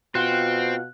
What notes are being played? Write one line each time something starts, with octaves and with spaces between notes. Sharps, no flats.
B2 C4 F4 F#5 F#6